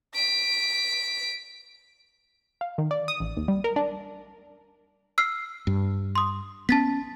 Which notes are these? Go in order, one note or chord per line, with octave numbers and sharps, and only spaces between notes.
B6 D7
F5
D#3
D5
D#6
A1
D#2
G3
A#4
D4
E6 F6 C7
G2
C6 D#6
B3 C#4 A5 A6 B6